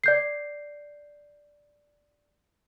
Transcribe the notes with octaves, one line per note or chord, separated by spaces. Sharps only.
D5 G6 C7